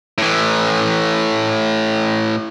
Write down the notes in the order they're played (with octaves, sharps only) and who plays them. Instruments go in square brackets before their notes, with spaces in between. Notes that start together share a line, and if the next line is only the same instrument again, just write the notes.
[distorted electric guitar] A2 E3